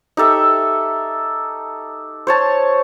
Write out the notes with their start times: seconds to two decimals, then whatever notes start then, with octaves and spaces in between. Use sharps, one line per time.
0.17 D#4 G4 A4 E5
2.27 C5 C#5 A5